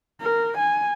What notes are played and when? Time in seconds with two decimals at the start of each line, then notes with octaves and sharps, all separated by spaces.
0.21 A#4
0.58 G#5